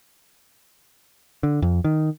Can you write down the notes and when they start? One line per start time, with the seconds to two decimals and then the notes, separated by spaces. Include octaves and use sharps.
1.43 D3
1.62 F2
1.84 D#3